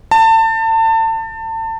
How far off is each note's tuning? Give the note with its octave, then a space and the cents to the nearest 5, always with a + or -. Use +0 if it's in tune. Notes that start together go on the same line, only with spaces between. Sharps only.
A5 +30